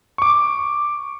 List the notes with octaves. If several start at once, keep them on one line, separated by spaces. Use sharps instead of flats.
C#6 D6